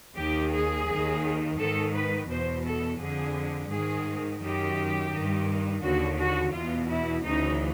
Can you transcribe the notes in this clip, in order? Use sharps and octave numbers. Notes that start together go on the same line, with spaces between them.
D#2 D#3 G4
G#4
D#2 D#3
G#2 D#3 A4
B4
E2 B2 C5
A4
F2 D3 G#4
G#2 D#3 G#4
F#2 D#3 G4
G2 D#3
D#2 D3 F#4
F#4
E2 B2 F4
E4
D2 C#3 E3 D#4